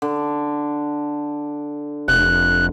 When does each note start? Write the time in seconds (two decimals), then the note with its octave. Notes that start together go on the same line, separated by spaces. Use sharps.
0.02 D3
2.08 F1 F#6